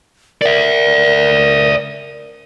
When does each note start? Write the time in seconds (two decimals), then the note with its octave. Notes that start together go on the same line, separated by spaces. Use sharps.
0.42 A#4 D5 E5